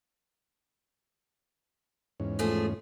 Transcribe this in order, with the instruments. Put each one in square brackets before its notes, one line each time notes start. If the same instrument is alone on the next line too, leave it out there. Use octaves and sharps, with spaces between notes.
[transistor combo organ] E2 G#2 C#4
[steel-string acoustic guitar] F3 A3 G#4